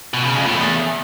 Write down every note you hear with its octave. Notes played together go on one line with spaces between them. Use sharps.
B2
C#3
F2
A2
E2